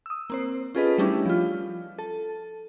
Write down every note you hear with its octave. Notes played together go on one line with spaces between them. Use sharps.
D#6 E6
A#3 C4 C5
C#4 F4 G#4 A4 B4 D#5
G3 A3 C#4 D4 E4 G4
F3 F4
A4 A5